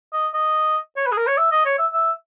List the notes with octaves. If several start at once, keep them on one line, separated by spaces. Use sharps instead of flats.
D#5
D#5
C#5
B4
G#4
A#4
C#5
E5
D#5
C#5
E5
E5